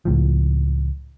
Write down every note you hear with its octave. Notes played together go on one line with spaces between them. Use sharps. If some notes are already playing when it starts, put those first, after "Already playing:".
C#2 A2 F3